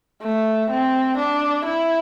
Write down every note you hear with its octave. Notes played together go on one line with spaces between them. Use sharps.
A3
C4
D4
E4